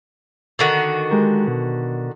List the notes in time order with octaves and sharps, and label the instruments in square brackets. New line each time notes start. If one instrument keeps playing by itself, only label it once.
[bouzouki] D3 D#3 F#4
[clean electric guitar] G#3 G4 A#4
B2